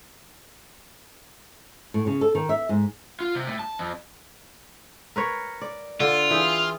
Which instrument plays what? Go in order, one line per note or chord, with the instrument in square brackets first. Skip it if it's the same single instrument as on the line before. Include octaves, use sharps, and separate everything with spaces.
[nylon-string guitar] A2
C#3
A4
D#3
E5
G#2
[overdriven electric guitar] F4
C3
A2
A5
F2
[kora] A#4 B4 C#5
D5
[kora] D3 [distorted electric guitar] F4
[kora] E3 G#4 G5